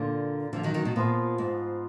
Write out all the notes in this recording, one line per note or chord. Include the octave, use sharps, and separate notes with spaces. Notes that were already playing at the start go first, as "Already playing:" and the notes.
Already playing: A#2 D3 A#3 F4
D3 F3
D#3 F#3
D#3 F#3
B2
A#2 F3 B3 F4 G#4
G#2